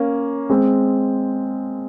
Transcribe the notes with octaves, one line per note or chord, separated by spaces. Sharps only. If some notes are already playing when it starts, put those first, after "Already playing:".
Already playing: A#3 C#4
G#3 C4